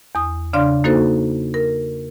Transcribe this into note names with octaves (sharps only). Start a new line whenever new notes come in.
E2 D#6
C#3 D4 D5 F5 C6 F6
A#3 D#4 F#4 A4 C5
A#4